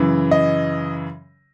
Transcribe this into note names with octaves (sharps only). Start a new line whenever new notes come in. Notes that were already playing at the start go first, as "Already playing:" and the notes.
Already playing: F#2 C#3 E3
D#5